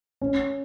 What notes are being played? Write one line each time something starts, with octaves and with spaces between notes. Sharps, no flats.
C#4